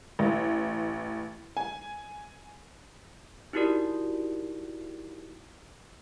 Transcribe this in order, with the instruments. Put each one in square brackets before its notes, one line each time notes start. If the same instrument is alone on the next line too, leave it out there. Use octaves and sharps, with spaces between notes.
[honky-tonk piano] A1
G#5
[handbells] D#4 E4 F#4 G4 A#4 D5